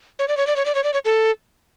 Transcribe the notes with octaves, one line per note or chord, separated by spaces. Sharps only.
C#5
D5
C#5
D5
C#5
D5
C#5
D5
C#5
A4